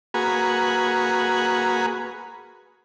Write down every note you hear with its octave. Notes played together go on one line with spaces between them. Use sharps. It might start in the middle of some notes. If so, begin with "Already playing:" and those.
A#3 F#4 G#4 B4